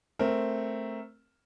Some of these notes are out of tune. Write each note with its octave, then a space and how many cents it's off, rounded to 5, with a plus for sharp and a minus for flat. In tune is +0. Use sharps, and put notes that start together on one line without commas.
A3 +0 C4 +0 A#4 +0